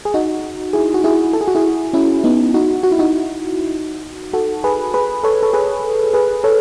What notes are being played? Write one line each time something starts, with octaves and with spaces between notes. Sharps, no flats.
G#4
D#4 F#4
E4 G#4
F#4
E4 G#4
A4
G#4
F#4
E4 G#4
C#4 E4
B3 D#4
D#4 F#4
F#4
E4
D#4 F#4
F#4 A4
G#4 B4
G#4 B4
A4 C#5
A4
G#4 B4
G#4 B4
A4 C#5